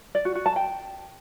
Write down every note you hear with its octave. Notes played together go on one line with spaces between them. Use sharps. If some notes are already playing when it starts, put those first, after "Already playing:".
D5
F#4
F#4
A5
G5